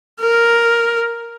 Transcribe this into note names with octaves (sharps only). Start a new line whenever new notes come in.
A#4